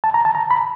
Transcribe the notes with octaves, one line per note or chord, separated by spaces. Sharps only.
A5
A#5
A5
A#5
B5